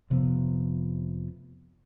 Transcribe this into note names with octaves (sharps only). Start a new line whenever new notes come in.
F1 C3 F3 B3